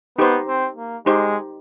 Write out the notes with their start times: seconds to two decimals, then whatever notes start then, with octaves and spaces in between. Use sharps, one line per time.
0.18 B3 D#4 G4 C5
0.47 C4
0.77 A#3
1.06 G#3 D#4 G4 C5